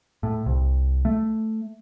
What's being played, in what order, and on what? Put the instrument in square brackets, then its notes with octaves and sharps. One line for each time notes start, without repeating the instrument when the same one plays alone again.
[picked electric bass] A2
C2
A3